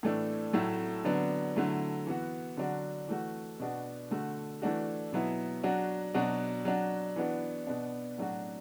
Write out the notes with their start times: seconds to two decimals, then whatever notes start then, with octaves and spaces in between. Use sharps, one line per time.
0.03 A2 E3 A3 D4
0.53 A2 F#3 A3 E4
1.05 D3 F#3 B3 D4
1.56 D3 F#3 A3 E4
2.07 E3 B3 F#4
2.57 D3 F#3 D4 F#4
3.08 E3 A3 F#4
3.59 B2 B3 D4 F#4
4.11 D3 A3 F#4
4.62 E3 A3 D4 F#4
5.13 B2 F#3 B3 E4
5.64 F#3 D4 F#4
6.14 B2 F#3 D4 F#4
6.65 F#3 D4 F#4
7.16 E3 B3 D4 F#4
7.67 B2 B3 D4
8.18 A2 F#3 D4 F#4